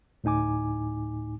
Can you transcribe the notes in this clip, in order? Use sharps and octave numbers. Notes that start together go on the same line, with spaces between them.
D2 A2 D#4 G#5 D6